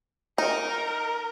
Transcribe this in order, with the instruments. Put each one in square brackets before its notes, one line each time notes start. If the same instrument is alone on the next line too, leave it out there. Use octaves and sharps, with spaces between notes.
[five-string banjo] D#4 [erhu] A#4